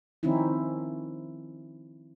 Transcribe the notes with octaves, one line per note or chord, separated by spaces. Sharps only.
D#3 F3 C4 C#4 D#4 E4